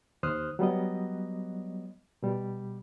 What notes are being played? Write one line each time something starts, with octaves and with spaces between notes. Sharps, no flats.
D#2 C5 D#6 F6 F#6
F#3 G3 B3 D#5
B2 G3